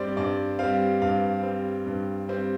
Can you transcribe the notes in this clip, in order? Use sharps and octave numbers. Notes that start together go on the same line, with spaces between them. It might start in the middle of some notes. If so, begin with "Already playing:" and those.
Already playing: G2 G3 C4 G4 C5 D5
G2 D5
G3 C4 F5
G2 F5
G3 C4
G2
G3 C4